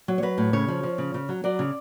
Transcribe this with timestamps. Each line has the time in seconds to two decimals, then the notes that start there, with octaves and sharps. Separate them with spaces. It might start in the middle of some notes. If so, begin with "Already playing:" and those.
0.08 F#3
0.18 C#5
0.23 F#3 B4
0.38 A2
0.53 C#3 C#5
0.68 F3
0.83 F3
0.98 C#3
1.14 C#3
1.29 F#3
1.44 F#3 D5
1.59 C#3